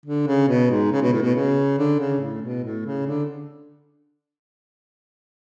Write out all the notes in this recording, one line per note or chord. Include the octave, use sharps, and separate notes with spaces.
D3
C#3
B2
G#2
C#3
B2
A2
B2
C#3
D3
C#3
A2
B2
A2
C#3
D3